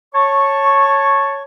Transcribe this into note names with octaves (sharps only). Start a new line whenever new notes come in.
C#5 A5 C#6